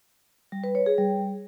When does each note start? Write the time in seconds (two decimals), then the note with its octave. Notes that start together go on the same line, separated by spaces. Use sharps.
0.52 G3
0.64 B4
0.75 C#5
0.86 G#4
0.98 G3